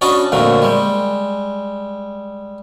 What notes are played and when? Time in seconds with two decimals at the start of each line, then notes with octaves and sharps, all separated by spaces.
0.01 C#4 D4 F#4 D#5 A5 B5
0.32 F2 A#2 D3 F#3 A3
0.62 G3 G#3